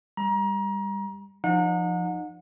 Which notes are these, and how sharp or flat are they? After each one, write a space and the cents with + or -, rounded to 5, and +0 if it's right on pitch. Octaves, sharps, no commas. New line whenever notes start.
G3 +25 A#5 +30
F3 +0 D#4 -30 F#5 -35